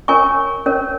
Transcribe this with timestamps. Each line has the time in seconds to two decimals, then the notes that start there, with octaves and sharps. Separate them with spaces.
0.08 C#4 A#4 C#5 G#5 C#6
0.66 C#4 A#4 C#5